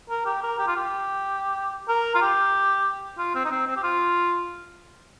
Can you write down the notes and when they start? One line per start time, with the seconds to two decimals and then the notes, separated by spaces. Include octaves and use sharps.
0.10 A#4
0.26 G4
0.43 A#4
0.59 G4
0.67 F4
0.76 G4
1.88 A#4
2.14 F4
2.22 G4
3.18 F4
3.35 C4
3.45 D#4
3.51 C4
3.67 C4
3.77 G4
3.83 F4